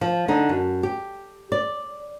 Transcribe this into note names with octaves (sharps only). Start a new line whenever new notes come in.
F3
D3 D#4
F#2
G4
D5